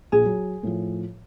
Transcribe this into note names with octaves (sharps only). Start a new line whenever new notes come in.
A#1 G#4
F#3
A2 F3